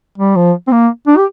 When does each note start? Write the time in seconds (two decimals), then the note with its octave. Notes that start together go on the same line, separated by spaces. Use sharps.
0.18 G3
0.36 F3
0.68 C4
0.72 A#3
1.08 D4
1.17 G4